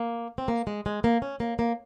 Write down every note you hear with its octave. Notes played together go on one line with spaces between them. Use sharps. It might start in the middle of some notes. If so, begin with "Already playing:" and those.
Already playing: A#3
C4
A#3
G#3
G#3
A#3
C#4
A#3
A#3